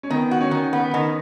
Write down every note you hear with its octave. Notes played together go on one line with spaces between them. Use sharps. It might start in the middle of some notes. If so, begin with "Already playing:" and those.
C#4
D#3 B3
F#4
C#4
D#3
B3
D#3